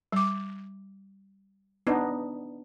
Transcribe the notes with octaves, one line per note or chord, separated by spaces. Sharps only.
G3 D6
B3 D4 D#4